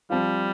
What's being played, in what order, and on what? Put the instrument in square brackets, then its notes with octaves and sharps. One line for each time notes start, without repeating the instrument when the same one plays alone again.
[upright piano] F3 C4 F4 [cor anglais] G3